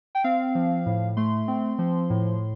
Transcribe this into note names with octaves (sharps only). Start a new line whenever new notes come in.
G5
C4 F5
F3
A2
A3 C6
C4
F3
A2